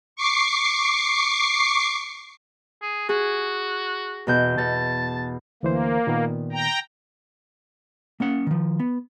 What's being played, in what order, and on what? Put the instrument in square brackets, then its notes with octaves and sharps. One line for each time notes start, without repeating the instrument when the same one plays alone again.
[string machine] C#6 D6 C7
[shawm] G#4
[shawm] F#4 [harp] G#4
[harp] E2 B2 G6
[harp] B2 [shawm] A5
[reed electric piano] D2 E3 C5 [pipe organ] A#3
[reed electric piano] A#2 D#3 B3
[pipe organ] G5 A#5
[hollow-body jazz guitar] A#3 C#4 F#5
D#3 F3
B3